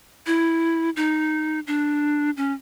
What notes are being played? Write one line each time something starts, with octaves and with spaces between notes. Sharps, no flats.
E4
D#4
D4
C#4